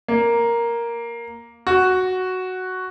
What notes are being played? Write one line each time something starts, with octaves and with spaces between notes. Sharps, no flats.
A#3
F#4